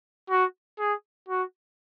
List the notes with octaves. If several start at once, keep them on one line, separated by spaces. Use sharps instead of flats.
F#4
G#4
F#4